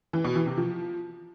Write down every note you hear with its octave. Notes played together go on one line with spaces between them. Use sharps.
E3
B2
E3
C3
F3